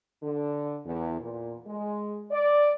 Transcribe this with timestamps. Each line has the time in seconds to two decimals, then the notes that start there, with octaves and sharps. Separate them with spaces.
0.23 D3
0.86 E2
1.20 A#2
1.67 G#3
2.31 D5